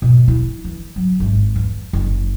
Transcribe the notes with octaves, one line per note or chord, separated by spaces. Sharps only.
B2
E4
E3
F#3
G#1
E2
F#1